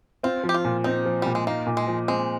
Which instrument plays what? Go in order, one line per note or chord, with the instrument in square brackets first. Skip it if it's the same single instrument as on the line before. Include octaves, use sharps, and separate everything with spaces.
[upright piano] C4 [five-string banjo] F4
[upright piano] F3
[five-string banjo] G4
F4
[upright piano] A#2
[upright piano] C4 [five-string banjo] D#4
[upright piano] F3
[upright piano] A#2 [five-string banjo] G3
[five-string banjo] G#3
[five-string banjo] A#3 [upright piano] D#4
[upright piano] A#2
[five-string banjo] G#3
[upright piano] F3
[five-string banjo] G#3 [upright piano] C4